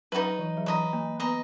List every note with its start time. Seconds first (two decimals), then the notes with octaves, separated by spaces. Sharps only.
0.12 F#3 D#4 F#4 B4
0.39 E3
0.57 F#3
0.66 E3 B4 D#5 A#5
0.93 A#3
1.19 B3 B4 D#5 A#5